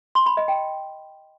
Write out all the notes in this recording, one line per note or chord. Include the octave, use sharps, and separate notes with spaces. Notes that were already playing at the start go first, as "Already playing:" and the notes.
C6
B5
D#5
G5